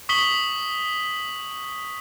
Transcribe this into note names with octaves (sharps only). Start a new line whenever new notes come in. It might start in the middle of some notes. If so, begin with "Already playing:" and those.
C#6 D#6 B6 F#7 G7